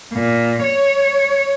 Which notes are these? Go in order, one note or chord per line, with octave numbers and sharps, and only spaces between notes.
A#2
C#5